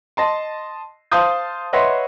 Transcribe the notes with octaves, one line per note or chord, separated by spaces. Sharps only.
D#5 A5 C6
C5 F5 A5 C6 D#6 G6
B4 C#5 D#5 E5 F#5 C6